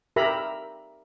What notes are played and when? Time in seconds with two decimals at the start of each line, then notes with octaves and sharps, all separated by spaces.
0.16 G4 A#4 E5 A#5 B5